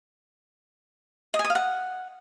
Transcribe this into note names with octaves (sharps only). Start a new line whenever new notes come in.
D#5
G#5
D#6
F5
F#5